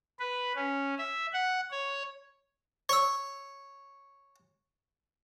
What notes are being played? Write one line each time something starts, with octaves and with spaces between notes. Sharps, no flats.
B4
C#4
E5
F#5
C#5
C#5 C#6 E6